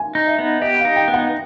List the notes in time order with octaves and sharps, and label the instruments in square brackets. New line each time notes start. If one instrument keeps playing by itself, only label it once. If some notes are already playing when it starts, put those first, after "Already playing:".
Already playing: [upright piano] G#5
[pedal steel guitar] D#4
[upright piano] E5
[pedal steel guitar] B3
[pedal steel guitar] G4 [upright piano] D#5
[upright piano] F5
[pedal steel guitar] D#4
[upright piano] G5
[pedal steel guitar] B3
[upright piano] F#5